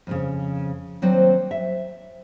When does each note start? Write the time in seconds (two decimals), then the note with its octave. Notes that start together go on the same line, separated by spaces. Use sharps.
0.07 F2 A#2 C#3
1.02 D#2 F#3 C4 D4 C5
1.51 E5